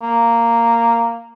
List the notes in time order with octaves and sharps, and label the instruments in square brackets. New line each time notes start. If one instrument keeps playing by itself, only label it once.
[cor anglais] A#3